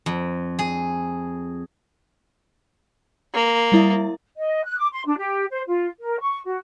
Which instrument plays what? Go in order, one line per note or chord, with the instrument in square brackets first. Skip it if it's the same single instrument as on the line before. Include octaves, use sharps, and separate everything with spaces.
[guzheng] F2
G#4
[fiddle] A#3
[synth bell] G3 E4 E5
[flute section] D#5
F#6
D6
C6
D4
G4
C5
F4
A#4
C#6
F#4